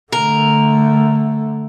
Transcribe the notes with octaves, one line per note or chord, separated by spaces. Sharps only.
D3 A3 A#4